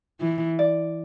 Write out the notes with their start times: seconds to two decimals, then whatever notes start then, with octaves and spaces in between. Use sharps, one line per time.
0.21 E3
0.59 D5